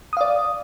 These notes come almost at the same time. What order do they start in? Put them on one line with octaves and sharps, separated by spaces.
D#6 F5 D5